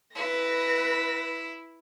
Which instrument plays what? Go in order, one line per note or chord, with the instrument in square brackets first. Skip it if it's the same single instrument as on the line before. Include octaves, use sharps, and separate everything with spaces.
[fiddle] E4 [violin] B4 A#6